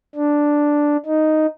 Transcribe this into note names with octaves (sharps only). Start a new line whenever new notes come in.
D4
D#4